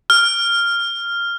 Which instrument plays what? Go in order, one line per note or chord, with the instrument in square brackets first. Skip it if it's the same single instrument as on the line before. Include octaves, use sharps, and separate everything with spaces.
[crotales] F6